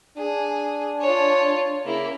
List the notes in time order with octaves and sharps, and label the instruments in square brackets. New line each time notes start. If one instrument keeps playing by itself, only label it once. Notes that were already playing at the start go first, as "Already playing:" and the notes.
[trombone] D4 [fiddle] G#4
[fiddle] F4 C#5
[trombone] C#3 [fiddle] A#3 E4